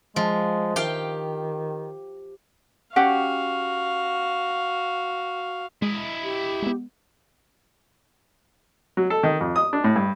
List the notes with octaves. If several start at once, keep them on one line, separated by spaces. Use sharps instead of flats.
F3 G#3
D#3 G4 F5 G5
C#4 F#4 G4 F5 F#5
G#3 E4 D#5
G4
G#3 B3
F#3
A4
D#3
F2
D#6
D4
A2
G2